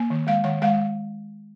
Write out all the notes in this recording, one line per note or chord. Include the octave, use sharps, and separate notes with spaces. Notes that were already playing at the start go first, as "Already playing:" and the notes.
Already playing: A#3
D#3
G#3 F5
D#3 F#5
G#3 F5